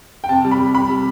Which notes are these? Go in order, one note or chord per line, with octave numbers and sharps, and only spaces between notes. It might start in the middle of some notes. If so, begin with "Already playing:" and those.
G5
C3 A5
G3
B5
G3
C3 B5
G3